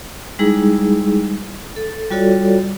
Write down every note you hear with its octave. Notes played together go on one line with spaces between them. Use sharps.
G3 G#3 D#4 E4 G#4
A4
G3 F4 F#4 A4 C#5 D5